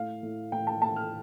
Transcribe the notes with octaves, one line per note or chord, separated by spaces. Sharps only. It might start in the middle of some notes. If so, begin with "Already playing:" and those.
Already playing: A2 F5
A2
A2 G5
A5
A3 A5
F6